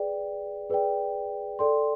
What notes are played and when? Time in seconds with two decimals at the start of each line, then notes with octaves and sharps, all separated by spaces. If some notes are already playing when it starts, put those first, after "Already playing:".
Already playing: G#4 B4 D5 G5
0.70 G#4 B4 D5 G5
1.59 A4 D5 G5 C6